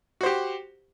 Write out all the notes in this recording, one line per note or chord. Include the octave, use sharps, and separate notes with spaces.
F#4 G4 C5